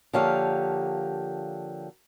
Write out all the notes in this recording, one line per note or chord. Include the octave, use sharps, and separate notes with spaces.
D3 F3 A#3 G4 C#5 F5